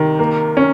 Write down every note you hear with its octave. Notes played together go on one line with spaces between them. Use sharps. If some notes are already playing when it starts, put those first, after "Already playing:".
Already playing: C3 D#3
A#3
C#4